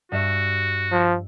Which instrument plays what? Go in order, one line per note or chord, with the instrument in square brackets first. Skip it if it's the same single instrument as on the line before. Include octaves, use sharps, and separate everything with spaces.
[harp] G2 E5 C#7 [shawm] F#4
[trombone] F3